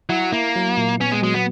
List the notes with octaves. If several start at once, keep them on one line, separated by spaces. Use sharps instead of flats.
F#3 E4
A#3 E4
F#3
A#2
B3 C#4
G#3
F#3 G#3
B3